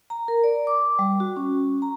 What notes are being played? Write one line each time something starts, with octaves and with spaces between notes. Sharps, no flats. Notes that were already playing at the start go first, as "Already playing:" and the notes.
A#5
A#4
D5
D6
G3
F#4
C#4
A#5